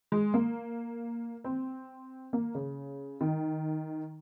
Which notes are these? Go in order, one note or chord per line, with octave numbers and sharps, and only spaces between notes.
G#3
A#3
C4
A#3
C#3
D#3